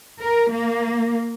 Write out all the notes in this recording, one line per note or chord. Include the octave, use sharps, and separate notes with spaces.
A#4
A#3